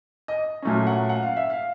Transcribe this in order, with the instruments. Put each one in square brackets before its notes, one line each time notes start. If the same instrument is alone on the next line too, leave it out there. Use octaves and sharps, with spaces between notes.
[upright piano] D#5
A#2 F#3 A3 C#4
F#5
F#5
F5
E5
F5